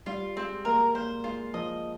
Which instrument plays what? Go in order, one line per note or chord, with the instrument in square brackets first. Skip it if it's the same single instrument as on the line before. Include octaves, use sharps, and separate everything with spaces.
[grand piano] G3 [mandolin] F4
[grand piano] G#3 [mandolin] C4
[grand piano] A#3 [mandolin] A#4
[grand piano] A#3 [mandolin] C5
[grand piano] G#3 [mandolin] F4
[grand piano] F3 [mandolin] D#5